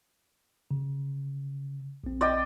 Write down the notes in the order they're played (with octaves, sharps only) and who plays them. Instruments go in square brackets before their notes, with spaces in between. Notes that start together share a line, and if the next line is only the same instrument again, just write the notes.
[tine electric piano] C#3
A#1 C4
[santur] D5 D#5 G5